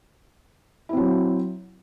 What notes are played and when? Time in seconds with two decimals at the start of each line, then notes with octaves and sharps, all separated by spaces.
0.89 E4
0.93 C4
0.97 F#3